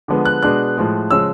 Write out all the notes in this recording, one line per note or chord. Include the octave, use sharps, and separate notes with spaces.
D3 F3 G#3 B3
F#6
B2 G#3 B3 D4 F#6
A2 F3 G#3
C#3 F3 G#3 C#4 E6